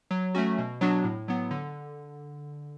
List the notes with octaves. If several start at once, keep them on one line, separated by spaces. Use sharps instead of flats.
F#3
A3 C#4 F#4
B2
F#3 B3 D4 F#4
A2
F#3 B3
D3